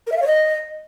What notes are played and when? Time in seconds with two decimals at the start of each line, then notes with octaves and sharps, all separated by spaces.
0.07 A#4
0.12 E5
0.17 F5
0.22 C#5
0.27 D#5